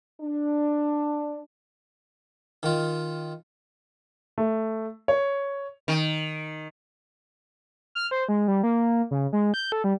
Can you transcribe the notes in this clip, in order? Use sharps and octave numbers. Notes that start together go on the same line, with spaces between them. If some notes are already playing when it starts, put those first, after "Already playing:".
D4
D#3 F4
A3
C#5
D#3
F6
C5
G#3
G3
A#3
C#3
G#3
G6
A4
G3